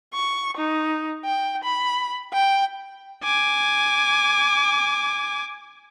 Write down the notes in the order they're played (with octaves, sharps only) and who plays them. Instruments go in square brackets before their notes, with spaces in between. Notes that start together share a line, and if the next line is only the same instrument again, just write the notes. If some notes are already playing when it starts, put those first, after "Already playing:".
[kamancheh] C#6
D#4
G5
B5
G5
[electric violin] G#5 D6